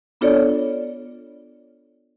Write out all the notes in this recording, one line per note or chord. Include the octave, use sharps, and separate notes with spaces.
B3 D4 F4 A4 C#5 D5